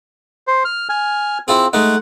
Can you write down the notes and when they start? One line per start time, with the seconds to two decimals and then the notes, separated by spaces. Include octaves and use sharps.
0.47 C5
0.65 F6
0.89 G#5 F6
1.48 C4 E4 F4 G#4
1.73 G#3 A3 D#4 F#5